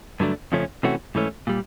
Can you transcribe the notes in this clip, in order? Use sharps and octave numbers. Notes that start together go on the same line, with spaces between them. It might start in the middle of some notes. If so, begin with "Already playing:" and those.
G2 D3 F#3 A3 D4
F2 C#3 F3 A3 C#4
C3 E3 A3 C#4 F#4
G#2 E3 A3 C#4
A#2 G3